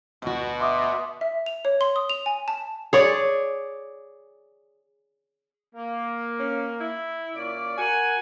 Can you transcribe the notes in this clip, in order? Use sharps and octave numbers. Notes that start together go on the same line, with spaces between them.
D2 B2 F#4
E5 C6 D6 D#6
E5
F7
C#5
C6
D#6
F7
G#5
A5
G#4 C#5 D5
A#3
C#4
E4
A#2 C#4 D5
F#4 A#4 F#5 G#5